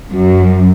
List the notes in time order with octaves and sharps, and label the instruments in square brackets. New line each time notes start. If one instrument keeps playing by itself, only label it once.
[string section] F#2